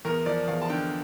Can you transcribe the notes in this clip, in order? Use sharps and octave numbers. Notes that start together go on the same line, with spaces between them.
E2 A#4
F3 D5
E2 F5
A5
D3 G5